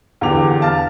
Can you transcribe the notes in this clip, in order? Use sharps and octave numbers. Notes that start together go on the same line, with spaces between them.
E2 D3 G4 D6 F7
F5 A5 F6 A6